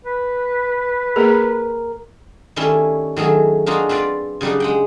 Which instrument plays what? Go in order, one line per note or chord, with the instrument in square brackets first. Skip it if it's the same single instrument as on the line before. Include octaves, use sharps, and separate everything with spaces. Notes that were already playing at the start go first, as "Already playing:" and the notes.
[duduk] B4
[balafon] A#3 G#4 [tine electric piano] A#4
[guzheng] D#3 G3 A3 C#4 E4
D#3 F#3 A3 G#4
A#3 D4 D#4 F4 F#4 G#4
C4 F4 B4 D5
C#3 F#3 G3 D4 D#4
G#3 F#5 G5